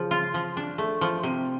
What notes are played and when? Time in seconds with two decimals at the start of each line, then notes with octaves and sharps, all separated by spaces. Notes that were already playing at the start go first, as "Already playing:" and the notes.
Already playing: C#3 F3
0.11 F4
0.34 F3
0.57 D4
0.78 A3
1.01 F3
1.23 C3